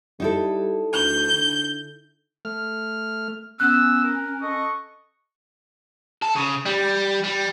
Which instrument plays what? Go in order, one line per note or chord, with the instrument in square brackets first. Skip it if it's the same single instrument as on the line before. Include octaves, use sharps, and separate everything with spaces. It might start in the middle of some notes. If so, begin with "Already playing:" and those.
[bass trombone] G3 [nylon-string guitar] D#4 E4 A4
[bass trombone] D2 [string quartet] G6
[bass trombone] D3
[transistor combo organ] A3 F6
[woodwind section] B3 [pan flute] C#4 [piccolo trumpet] E6 [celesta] F#6
[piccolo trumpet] A#4
[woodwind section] A4 D#5 [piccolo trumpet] C#6
[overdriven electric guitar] A4
C#3
G3
G3